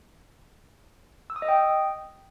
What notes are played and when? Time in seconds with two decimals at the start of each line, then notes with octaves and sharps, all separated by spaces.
1.30 E6
1.36 D#6
1.42 D#5
1.48 G5